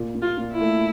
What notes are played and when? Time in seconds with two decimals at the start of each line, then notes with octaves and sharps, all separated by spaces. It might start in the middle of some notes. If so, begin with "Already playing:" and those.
Already playing: A#2
0.15 A#2
0.22 F4
0.37 A#2
0.52 E4
0.59 A3